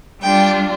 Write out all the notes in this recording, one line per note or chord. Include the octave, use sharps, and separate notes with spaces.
G3 D4 F4 G5